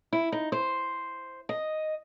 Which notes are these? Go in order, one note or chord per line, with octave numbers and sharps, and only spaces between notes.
E4
D#4
C5
D#5